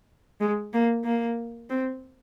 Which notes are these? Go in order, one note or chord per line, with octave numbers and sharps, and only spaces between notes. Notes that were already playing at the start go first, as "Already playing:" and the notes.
G#3
A#3
A#3
C4